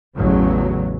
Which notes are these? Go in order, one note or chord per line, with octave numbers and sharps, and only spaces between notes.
A1 E2 C#3 F#3